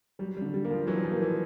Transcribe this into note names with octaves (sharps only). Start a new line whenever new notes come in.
F#3 G3
G3
D3
G3
A#3
F3
E3 F#3
F3
A#3
E3